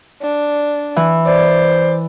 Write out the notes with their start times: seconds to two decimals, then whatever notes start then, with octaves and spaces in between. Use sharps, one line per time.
0.22 D4
0.96 E3
1.26 C5 D5